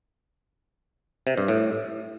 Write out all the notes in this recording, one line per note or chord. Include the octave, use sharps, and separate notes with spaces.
C3
G2
A2